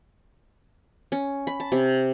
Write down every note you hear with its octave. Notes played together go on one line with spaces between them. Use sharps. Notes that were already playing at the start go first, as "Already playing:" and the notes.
C#4
B5
A5
C3